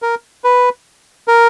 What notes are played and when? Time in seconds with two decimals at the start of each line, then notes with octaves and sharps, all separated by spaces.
0.02 A#4
0.44 B4
1.28 A#4